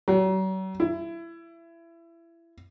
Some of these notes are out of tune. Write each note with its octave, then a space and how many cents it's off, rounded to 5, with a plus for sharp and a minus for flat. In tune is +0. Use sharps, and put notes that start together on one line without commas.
F#3 +40
E4 +25